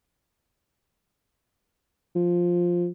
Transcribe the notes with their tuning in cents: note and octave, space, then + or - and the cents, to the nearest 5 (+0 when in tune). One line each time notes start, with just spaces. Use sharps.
F3 +5